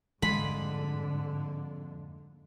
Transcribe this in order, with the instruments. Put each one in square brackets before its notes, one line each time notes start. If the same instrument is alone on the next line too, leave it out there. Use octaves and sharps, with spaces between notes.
[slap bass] F2 G3 [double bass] G#2 D3 [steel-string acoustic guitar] G#3 A#3 G#5 [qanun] B5